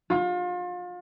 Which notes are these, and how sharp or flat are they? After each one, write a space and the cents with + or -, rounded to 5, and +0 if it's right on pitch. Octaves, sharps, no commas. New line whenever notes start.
F4 +35